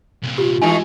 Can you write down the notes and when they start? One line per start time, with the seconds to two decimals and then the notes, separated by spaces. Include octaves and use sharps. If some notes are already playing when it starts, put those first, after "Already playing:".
0.23 C2 A#2
0.38 F4 G4
0.61 G#2 E3 A3 D#4 G#5